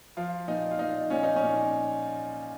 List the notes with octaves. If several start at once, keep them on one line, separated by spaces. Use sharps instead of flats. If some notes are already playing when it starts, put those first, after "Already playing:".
F3 F4
A#2 D#4
F4
A#2 D#4
A#2 C#4
D#4
C#4
A#2